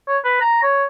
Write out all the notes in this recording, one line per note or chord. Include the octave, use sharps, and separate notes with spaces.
C#5
B4
A#5
C#5